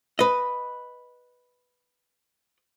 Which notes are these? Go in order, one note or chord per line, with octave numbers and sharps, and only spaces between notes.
B4 D#5